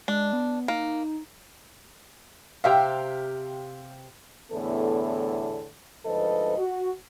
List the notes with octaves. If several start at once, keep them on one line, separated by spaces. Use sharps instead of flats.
G#3 D4
B3
A#3 D#4
C3 G4 E5 F5 G5 A#5
E2 A2 D3 B3 A4
D2 G#2 F3 A4 B4 D#5
F#4